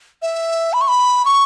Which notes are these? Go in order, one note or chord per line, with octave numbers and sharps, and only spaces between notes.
E5
B5
C#6
B5
C#6